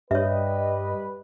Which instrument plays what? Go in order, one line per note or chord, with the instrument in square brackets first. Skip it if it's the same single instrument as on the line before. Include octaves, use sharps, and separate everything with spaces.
[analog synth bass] G2 [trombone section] G3 B4 [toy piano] C#5 E5 [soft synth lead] D#5